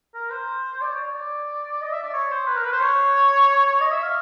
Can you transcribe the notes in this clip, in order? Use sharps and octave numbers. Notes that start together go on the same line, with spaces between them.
A#4
C5
D5
C#5
C#5
D5
D#5
E5
D5
C#5
C5
B4
A#4
B4
C5
C#5
D#5
E5
F5